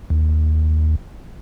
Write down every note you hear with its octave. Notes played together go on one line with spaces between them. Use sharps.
D#2